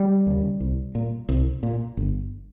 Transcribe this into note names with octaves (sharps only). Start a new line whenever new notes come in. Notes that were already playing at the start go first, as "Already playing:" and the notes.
Already playing: G3
D#2 C#3
C2
A#2
C2
A#2
G1